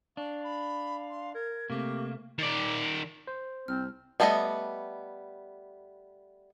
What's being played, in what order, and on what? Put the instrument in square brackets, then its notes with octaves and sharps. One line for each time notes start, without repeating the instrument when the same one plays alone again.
[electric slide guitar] D4 [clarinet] F5 [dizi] C#6
[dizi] B5
C6
[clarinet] A#4 [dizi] G#6
[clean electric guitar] C3 A3 C4 [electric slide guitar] A#3 [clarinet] G4 [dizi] C#6
[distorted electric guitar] D#3 D5
[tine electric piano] C5
[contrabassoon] C2 [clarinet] C4 [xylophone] F6
[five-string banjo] G3 A3 B3 D4 D#5